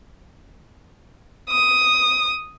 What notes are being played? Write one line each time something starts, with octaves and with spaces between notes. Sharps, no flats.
D#6